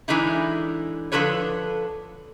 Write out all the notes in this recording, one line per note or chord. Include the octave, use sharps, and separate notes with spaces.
D3 E3 G#3 D#4 E4
D3 F3 F#4 A4 B4 C#5